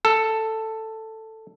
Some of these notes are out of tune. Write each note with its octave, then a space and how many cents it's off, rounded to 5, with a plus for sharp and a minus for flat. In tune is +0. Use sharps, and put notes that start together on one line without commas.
A4 +5